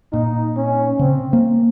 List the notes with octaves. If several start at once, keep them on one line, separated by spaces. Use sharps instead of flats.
A#2 D#4
C#4
C#3 C4
A#3